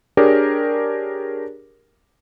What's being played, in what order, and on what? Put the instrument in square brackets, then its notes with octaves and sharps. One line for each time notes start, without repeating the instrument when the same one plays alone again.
[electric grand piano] D4 G4 G#4 A#4 C#5 D5